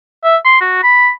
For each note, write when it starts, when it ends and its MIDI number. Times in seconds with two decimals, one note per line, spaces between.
0.24 0.37 76
0.45 0.58 84
0.61 0.79 66
0.83 1.09 83